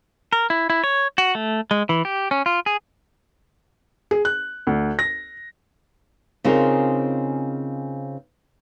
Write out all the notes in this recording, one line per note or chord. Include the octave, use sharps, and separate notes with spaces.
A#4
E4
E4
C#5
F#4
A3
G#3
E3
G4
C#4
F4
G#4
G#4
F#6
D2
A#6
C#3 C4 D#4 F4 G#4 A#4